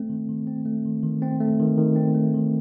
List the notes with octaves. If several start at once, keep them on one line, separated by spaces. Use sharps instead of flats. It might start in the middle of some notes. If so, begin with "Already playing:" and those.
Already playing: A3 C4
D#3
D#3
C4
A3
D#3
D#3
C4
A3
D#3
D#3
C4
A3
D#3